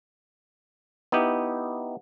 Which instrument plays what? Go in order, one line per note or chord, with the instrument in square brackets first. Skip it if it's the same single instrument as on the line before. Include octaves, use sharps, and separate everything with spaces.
[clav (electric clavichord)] B3 D#4 E4 G4